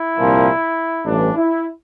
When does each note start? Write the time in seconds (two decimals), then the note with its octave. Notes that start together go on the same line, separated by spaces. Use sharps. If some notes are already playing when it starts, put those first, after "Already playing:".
Already playing: E4
0.16 C2 A#2 F3
1.04 A1 G2 E3 D4
1.34 E4